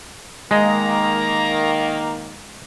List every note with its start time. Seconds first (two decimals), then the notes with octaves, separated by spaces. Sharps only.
0.51 D#3 G#3 A#3 D#5 A#5